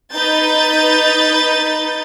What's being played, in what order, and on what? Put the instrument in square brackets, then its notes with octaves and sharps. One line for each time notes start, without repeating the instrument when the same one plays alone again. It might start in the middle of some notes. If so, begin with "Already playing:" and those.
[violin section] D#4 B4 G6 A6